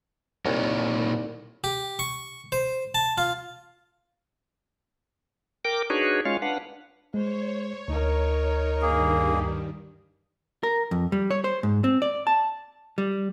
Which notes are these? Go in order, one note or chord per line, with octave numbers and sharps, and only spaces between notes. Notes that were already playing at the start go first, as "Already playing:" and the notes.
C2 A#2 D#4 C#5
G4
C#6
C5
A5
F4
A#4 G5 D6
D4 D#4 F#4 G#4 B4 C#5
G#3 C#4 F4 C#5 F5
D4 B4 F5 F#5
G#3 C5 C#5
D2 D#4 A#4
G2 D#3 G3 A#3 G#4
A#4
F2
G3
C#5
C5
G#2
C4
D5
A5
G3